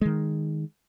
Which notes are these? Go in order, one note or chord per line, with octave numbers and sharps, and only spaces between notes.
D#3 G#3